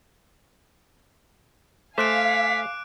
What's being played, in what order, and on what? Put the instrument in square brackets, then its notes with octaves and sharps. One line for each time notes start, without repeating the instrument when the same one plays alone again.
[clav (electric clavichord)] A3 C5 [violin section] F5 G#5 [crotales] D6 F#6 D7 [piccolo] B6